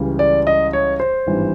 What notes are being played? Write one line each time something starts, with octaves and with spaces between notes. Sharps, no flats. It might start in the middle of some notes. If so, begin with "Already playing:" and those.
Already playing: C#2 C#3 E3 G3
D5
D#5
C#5
C5
G#1 G2 E3 G3